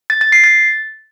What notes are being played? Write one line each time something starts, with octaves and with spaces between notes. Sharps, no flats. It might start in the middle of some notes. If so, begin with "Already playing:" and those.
A6
A6
C7
A6